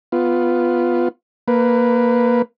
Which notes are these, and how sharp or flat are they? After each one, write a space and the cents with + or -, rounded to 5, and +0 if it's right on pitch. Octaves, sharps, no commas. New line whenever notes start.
B3 +5 F4 +0
A#3 +0 B4 +5